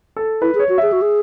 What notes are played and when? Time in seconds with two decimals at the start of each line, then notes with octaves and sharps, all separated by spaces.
0.16 A4
0.42 E4 B4
0.55 G#4
0.59 C#5
0.69 F#4
0.78 G#4 E5
0.92 F#4
1.02 G#4